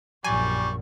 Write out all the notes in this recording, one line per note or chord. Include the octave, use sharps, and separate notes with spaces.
A#1 F#2 G3 G#5 C#6